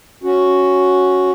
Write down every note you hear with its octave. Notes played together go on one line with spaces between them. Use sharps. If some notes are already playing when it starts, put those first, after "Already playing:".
C#4 F#4